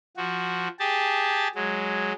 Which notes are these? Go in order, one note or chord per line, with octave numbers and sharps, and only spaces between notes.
F3 F#4
G4 G#4 A5
F#3 G#3